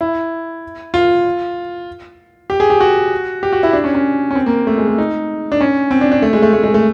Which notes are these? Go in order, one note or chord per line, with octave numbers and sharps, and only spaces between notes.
E4
F4
G4
G#4
G4
F#4
G4
F#4
E4
D4
C#4
C#4
C#4
C4
A#3
A3
G#3
A3
D#4
D4
C#4
C4
D4
D4
A3
G#3
A3
A3
G#3
A3